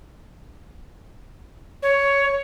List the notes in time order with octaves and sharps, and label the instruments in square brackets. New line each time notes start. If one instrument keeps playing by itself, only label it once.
[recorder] C#5